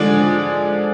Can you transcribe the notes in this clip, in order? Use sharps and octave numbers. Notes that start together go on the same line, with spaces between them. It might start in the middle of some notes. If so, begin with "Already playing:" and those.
Already playing: D3 F3 G#3 D5